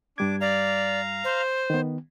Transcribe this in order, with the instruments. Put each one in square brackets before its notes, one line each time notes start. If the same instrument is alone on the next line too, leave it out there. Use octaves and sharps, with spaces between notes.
[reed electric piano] G2 G3 G#6 [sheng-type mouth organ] D4 D6
[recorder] D5 [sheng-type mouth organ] F5 A#5
[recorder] C5
[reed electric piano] D#3 B3